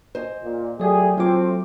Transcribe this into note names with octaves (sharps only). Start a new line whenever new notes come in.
C5 D#5 G#5
A#2
F#3 A3 G4 G#4 D5
F#3 A3 C4 F4 C5 D6